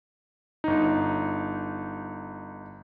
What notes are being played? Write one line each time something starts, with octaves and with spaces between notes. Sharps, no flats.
G1 D#4